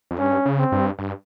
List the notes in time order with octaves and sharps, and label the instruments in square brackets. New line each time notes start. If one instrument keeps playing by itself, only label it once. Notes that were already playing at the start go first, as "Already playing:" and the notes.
[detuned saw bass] F2
[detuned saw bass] G2 [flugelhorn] C#4
[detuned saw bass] C#3
[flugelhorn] C4
[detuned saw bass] G2
G2